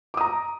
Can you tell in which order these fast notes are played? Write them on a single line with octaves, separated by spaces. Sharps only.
D6 D#6 A#5